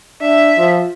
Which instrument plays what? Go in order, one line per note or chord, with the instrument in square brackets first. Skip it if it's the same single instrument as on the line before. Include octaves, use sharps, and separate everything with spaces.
[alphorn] D4 [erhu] E5
[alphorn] F3